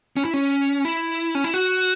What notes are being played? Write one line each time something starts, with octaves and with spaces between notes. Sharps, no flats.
C#4
E4
C#4
E4
C#4
E4
F#4